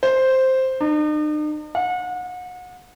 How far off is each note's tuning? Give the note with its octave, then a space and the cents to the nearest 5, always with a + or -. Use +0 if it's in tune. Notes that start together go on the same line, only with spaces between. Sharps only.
C5 +0
D#4 -45
F#5 -35